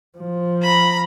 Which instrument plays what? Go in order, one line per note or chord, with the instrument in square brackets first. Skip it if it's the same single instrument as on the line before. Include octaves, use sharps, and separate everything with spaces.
[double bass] F3
[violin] A#5 B5